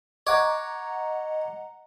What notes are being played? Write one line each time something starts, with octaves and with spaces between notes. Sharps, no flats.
C#5 D#5 F#5 A#5 D6